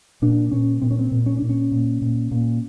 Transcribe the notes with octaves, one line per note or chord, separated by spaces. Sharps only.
A#2 D4
A#2 C#4
A#2 C4
C#4
C4
A#2
C#4
A#2 D4
C#4
A#2
A#2
A#2